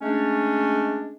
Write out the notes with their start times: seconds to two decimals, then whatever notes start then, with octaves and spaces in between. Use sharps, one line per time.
0.02 G#3 A3 C#4 D4